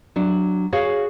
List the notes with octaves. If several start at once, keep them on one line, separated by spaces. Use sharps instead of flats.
F#3 D4
F#4 G#4 C#5 F5